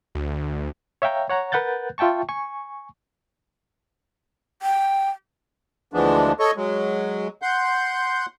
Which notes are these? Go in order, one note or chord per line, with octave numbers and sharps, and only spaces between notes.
D2
C#5 E5 F5 G5 A#5
C#5 F#5 A#5
A#4 B4 F#5 F#6 G6 A6
F4 E5 G5 A5 C#6
G#5 C#6
G5
D2 E3 F3 G#3 B3 D4
A4 C#5 D#5 C#6
F#3 G#3
F#5 C6 G6